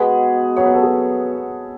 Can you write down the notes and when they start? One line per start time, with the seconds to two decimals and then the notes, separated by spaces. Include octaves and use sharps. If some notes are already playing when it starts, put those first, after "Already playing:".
Already playing: B2 G#3 B3 G#4 B4
0.56 C#3 F#3 B3 C#5
0.66 B4
0.74 A4
0.83 G#4 B4